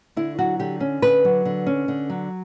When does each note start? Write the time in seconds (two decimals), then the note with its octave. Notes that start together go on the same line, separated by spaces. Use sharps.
0.16 D3 E4
0.39 F#3 F#4
0.60 D3 G4
0.80 C#4
1.02 D3 B4
1.25 F#3
1.45 D3
1.66 C#4
1.88 D3
2.10 F#3